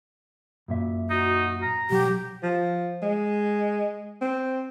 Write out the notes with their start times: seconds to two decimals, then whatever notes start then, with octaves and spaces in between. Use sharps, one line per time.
0.68 F#2 A#2 E5
1.10 D#4 F#4
1.63 A#5
1.90 B1 F#3 G4
2.43 F3
3.02 G#3
4.21 C4